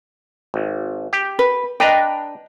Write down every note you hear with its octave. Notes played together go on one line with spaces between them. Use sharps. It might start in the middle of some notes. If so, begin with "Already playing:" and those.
G#1
G4
B4
D4 B4 D#5 G5 A#5